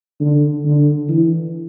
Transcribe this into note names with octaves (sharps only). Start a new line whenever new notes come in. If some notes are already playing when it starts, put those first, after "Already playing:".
D3
D3
E3